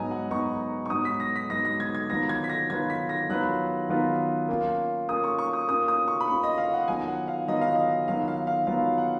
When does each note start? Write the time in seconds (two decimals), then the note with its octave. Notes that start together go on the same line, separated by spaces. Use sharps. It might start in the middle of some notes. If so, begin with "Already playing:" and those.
Already playing: G#2 F#3 B3 D#4 G#5 A#5
0.11 F#5
0.31 G#2 F#3 B3 D#4 C#6
0.86 C#6
0.90 G#2 F#3 B3 D#4 D#6
1.05 B6
1.20 A#6
1.36 B6
1.50 G#2 F#3 B3 D#4 A#6
1.65 A#6
1.80 G#6
1.95 G#6
2.10 D#3 F#3 B3 F4 B4 A#6
2.29 G#6
2.44 B6
2.49 A#6
2.70 D#3 F#3 B3 F4 B4 G#6
2.90 B6
3.09 A#6
3.29 D#3 F#3 B3 F4 B4 F#6
3.89 D#3 F#3 B3 F4 B4
4.49 A#3 C#4 F4
5.09 A#3 C#4 F4 D#6
5.24 C#6
5.38 C#6
5.53 D#6
5.68 A#3 C#4 F4 D#6
5.88 D#6
6.08 C#6
6.20 B5
6.28 A#3 C#4 F4 C#6
6.43 D#5
6.58 F5
6.74 F#5
6.88 D#3 F#3 B3 F4 G#5
7.08 F#5
7.28 F5
7.48 D#3 F#3 B3 F4 D#5
7.61 F5
7.75 D#5
8.08 D#3 F#3 B3 F4 F5
8.28 F5
8.47 F5
8.67 D#3 F#3 B3 F4 F5
8.98 F#5